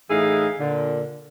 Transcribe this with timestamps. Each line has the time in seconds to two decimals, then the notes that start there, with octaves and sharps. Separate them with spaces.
0.10 A2 E3 D#4 G#4 E5 F5
0.59 A#2 D3